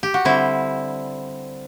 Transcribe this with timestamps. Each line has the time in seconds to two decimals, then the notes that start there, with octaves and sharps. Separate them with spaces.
0.03 G4
0.14 F#4
0.25 D3 G3 C4 E4